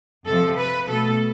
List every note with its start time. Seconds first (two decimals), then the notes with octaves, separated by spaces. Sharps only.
0.26 F2 C3 F3 A4
0.57 B4
0.89 B2 A3 A4